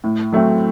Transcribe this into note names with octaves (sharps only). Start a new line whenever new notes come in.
A2
F#3 A3 C4